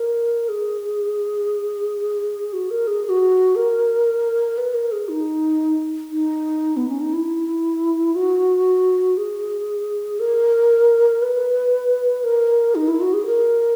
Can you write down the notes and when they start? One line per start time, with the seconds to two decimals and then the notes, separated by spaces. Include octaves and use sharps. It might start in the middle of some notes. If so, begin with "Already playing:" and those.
Already playing: A#4
0.49 G#4
2.53 F#4
2.70 A#4
2.87 G#4
3.05 G#4
3.09 F#4
3.56 A#4
4.58 B4
4.75 A#4
4.92 G#4
5.09 D#4
6.11 D#4
6.77 B3
6.89 C#4
7.01 D#4
7.13 E4
8.15 F#4
9.17 G#4
10.20 A#4
11.22 B4
12.24 A#4
12.75 D#4
12.88 E4
13.01 F#4
13.14 G#4
13.26 A#4